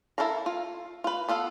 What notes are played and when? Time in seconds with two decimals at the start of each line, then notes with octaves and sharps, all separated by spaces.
0.18 E4 A4 A#4 F5 A#5
0.46 F4
1.04 F4 B4
1.29 B3 F4 A4 F5